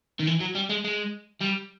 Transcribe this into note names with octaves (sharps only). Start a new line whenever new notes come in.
D#3
E3
F#3
G3
G#3
G#3
G3